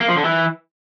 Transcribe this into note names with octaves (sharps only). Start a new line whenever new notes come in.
A#3
F3
D3
E3